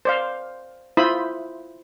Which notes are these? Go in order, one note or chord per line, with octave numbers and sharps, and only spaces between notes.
C5 D5 F5
E4 F4 C5 E5 B5 D#6